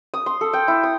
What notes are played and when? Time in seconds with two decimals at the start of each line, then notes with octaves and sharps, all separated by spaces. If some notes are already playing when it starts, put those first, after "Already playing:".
0.14 D#6
0.26 C6
0.41 A4
0.53 G5
0.68 E4
0.83 D#6